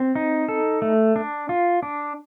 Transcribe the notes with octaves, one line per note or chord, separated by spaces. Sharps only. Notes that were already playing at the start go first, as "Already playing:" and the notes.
Already playing: C4
D#4
A4
A3
D4
F4
D4